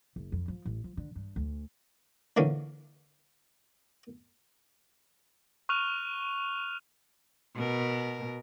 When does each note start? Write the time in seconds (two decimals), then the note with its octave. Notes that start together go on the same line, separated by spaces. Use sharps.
0.16 F#1
0.32 F2
0.48 F3
0.65 A1
0.84 F3
0.97 D3
1.16 G2
1.36 D2
2.37 A#2 D3 E3 C#4
5.69 C#6 F6 F#6 D#7 F7
7.56 B2 A#4